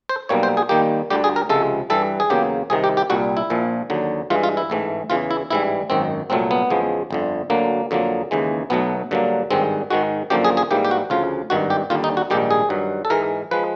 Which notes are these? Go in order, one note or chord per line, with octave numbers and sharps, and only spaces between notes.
C5
B1 B2 G3 A#3 C#5
C5
G#4
D#2 D#3 G3 A#3 G4
D2 D3 G3 G4
G#4
A#4
C#2 C3 F3 G#3 A4
G2 E3 G3 A4
G#4
E2 C#3 F#3 A#3 G4
C2 C3 D#3 G#4
G4
G4
C2 A#2 G3 F#4
E4
A#1 A#2 F3
D#2 D3 F#3
G2 E3 G#3 F4
F4
E4
A1 G#2 E3 A3
E2 C#3 E3 F4
E4
A1 G#2 E3 G3 E4
G#1 F#2 D#3 C4
C2 A#2 F#3 A3 C4
B3
E2 C#3 F3 G#3
G1 F2 D3
D2 D3 F#3 A#3
F2 D3 F#3 A#3
D#2 C#3 E3 G#3
B1 B2 F#3 A3 B3
G2 D3 F#3 A#3
G#1 G2 D#3 G#3 C4
G#2 D#3 G#3 F#4
F#2 D3 F3 A#3 G4
G#4
G#4
G#2 E3 G3 A#3 G4
G4
F#4
D2 C#3 F3 F4
G#1 G2 D#3 F#4
G4
D#2 D3 G3 F4
D#4
F#4
A#1 G#2 D#3 G3 G4
G#4
G2 D#3 F#3
A4
G#2 E3 G#3 A#4
F3 G#3 B4